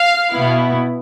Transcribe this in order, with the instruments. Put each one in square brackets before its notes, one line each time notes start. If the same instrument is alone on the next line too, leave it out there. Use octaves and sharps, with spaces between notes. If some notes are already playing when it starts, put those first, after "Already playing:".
Already playing: [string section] F5
B2 B3 E4